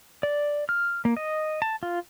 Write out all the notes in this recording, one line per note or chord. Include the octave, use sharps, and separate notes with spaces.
D5
F6
A#3
D#5
A5
F4